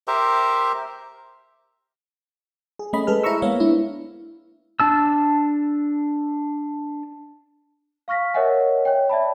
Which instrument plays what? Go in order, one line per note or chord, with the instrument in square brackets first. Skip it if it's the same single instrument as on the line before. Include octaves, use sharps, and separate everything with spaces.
[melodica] G4 A#4 C5 E5
[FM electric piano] G#4
A3 C#4 D#5 B5
G#3 G#4 A4 B4 F6
E4 C5 A#5 B5 C#6 E6
G#3 A#3 B3 C#5 E5 F5
G#3 B3 D4 E4
[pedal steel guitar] D4 A5 E6
[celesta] F5 C#6 F6 A#6 B6
A#4 C#5 D#5 E5 F#5 G#5
C#5 G5
D5 E5 A5 B5